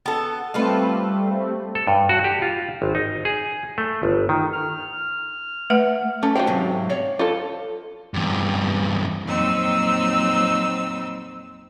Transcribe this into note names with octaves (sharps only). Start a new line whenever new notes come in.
B3 A4
G3 A3 C4 F4 A4 B4
A4
G2
F#4
G4
F4
G#1
D#4
G#4
A3
G1
D#3
F6
A3 B4 F#5
A3 C#4
F4 F#4 C5 F5 G5
G#2 C3 F#3
C#5 D5 F5
F4 A4
E2 G2
F2 A#2 F#3 C4 D#4 E6